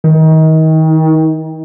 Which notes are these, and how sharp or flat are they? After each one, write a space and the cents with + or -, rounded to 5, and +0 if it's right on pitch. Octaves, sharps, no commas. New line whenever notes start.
D#3 +30